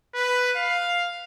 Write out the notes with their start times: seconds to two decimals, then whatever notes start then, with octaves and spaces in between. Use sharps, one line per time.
0.15 B4
0.56 F5